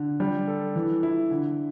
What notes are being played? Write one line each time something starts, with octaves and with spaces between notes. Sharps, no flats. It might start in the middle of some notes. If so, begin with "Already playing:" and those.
Already playing: D3
G3
A4
E3
E4
D3